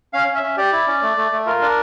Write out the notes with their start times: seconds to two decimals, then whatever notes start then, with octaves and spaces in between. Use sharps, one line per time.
0.13 C#4 F5
0.28 C#4
0.36 E5
0.43 C#4
0.57 G4 D5
0.73 E4
0.87 C#4
1.02 A3
1.17 A3
1.32 A3
1.46 F4 A#4
1.61 D4